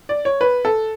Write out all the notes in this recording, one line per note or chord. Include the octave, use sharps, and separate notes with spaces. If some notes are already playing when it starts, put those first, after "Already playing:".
D5
C#5
B4
A4